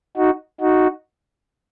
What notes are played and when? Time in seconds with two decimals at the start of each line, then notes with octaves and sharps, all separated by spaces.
0.17 D#4 F#4
0.61 D#4 F#4